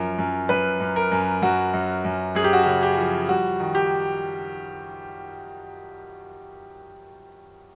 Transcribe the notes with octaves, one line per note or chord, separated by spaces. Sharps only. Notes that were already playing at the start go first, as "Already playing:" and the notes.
Already playing: F#2 F3 A#4
F#2
F#2 B4
F#2
A#4
F#2
F#2 F#4
F#2
F#2
F#2 G#4
G4
F#4
C#3 G4
G4
F3
G3 F#4
D#3
G4